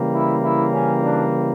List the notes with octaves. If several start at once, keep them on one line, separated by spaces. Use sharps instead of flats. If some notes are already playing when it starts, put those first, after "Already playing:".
Already playing: C#3 E3 G3 A#3
E4
E4
C#4
D4